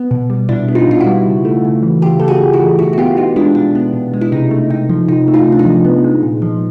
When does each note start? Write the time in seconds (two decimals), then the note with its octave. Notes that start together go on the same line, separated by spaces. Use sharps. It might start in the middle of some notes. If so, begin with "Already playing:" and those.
Already playing: B3
0.11 B2
0.30 G3
0.49 B2 D4 E4
0.68 B3
0.75 D#4 F4
0.88 B2 F4
1.00 E4 F#4
1.06 G3
1.26 C#3
1.45 A3
1.65 C#3
1.83 E3
2.02 C#3 F4 G4
2.20 A3 A4
2.28 F#4 G#4
2.40 C#3
2.53 E4 F#4
2.60 E3
2.79 B2 E4 F#4
2.93 F#4
2.98 B3 F4 G4
3.17 B2 D#4 F4
3.36 G#3 D4 E4
3.55 B2 D4
3.75 B3
3.93 B2
4.14 G#3
4.21 E4
4.32 C3 D#4
4.51 A3
4.70 C3 D#4
4.89 F3
5.08 C3 D#4
5.28 A3
5.34 D#4 F4
5.47 C3 D4
5.59 D#4
5.65 F3
5.85 B3
6.04 G#3
6.23 A#2
6.42 F3